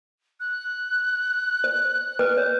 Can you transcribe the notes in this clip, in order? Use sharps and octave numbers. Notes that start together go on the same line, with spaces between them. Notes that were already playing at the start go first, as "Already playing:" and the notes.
F#6
C5
B4
C#5